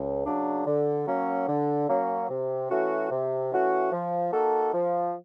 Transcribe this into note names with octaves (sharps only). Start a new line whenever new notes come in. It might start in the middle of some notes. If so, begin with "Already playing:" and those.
Already playing: C#2
C#3 F#3 A#3 D4
D3
F#3 A#3 C#4
D3
F#3 A#3 C#4
C3
E3 A3 C#4 F#4
C3
E3 A3 C#4 F#4
F3
A#3 D#4 F#4 A4
F3